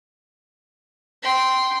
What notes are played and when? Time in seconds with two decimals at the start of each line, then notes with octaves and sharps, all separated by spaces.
1.22 G5 C6